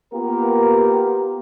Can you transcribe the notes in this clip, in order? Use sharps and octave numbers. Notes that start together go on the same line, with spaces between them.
A#3 B3 F4 G4 A#4